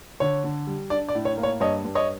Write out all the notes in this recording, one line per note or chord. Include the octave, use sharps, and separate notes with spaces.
D3 C#5
D3
G3
D4 D5
D5
A2
C#5
A#3
C#5
G2 C#5 D#5
G2
C#5 D#5